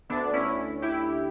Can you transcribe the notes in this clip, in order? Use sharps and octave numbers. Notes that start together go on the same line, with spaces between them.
D2 D3 B3 D4
C#4 E4
E4 G4